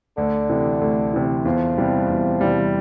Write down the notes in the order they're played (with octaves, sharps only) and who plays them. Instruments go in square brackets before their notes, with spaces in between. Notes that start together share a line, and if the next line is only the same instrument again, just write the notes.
[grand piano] D2 [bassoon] D3
[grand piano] C3 E3
D2
C3 E3
[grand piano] E2 [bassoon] F3
[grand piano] C3 E3 G3
E2
C3 E3 G3